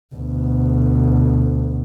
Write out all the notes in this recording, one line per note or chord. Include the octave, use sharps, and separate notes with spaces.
D2 B2